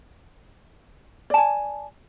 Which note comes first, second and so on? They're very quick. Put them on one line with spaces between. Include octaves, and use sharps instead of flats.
D5 A5 G#5